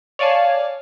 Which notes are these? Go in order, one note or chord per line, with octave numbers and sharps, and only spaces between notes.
C#5 D5 F5 G#5 A5